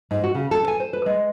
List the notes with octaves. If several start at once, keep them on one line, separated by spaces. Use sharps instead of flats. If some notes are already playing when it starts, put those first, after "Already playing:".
G#2
F#4
C#3
A4
G#5
C5
B4
G#3